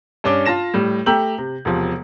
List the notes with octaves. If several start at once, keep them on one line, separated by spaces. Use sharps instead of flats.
G2 C#4 D4 D6 G7
F4 A5 A#6 E7
A2 G3
A3 G4 A#5 E6 G6 F#7
C3
E1 C3 F3